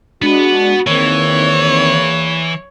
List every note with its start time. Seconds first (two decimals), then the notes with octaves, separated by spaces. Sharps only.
0.22 G#3 B3 D4 F#4 B4
0.87 E2 D#3 E3 A#3 C4 C#5